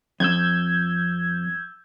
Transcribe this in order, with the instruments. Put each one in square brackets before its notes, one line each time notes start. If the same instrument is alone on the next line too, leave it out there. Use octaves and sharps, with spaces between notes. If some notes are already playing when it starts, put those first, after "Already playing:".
[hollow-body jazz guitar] F2 [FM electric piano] E6 G6 G#6